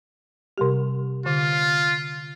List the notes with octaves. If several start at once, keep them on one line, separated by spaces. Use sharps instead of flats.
C3 G3 G4
D3 F4